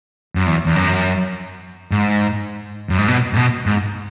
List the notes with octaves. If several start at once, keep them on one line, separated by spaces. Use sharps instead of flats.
F#2
E2
E2
F#2
G#2
F#2
G#2
B2
G#2
B2
G#2